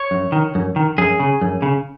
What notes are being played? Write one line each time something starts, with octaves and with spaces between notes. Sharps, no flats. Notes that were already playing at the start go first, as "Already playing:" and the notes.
Already playing: C#5
F#2
D#3
F#2
D#3
F#2 G#4
C#3
F#2
C#3